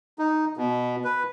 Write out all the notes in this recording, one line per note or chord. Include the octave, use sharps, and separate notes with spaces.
D#4
B2
B4